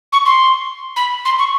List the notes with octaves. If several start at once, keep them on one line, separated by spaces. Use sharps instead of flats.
C#6
C6
B5
C6
C#6